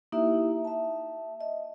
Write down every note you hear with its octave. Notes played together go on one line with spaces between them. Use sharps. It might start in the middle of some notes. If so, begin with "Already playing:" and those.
A#3 D#4 E4 G4 E5
E5 A5
D#5